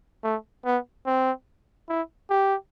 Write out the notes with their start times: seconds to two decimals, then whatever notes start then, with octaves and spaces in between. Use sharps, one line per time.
0.23 A3
0.65 B3
1.06 C4
1.89 E4
2.30 G4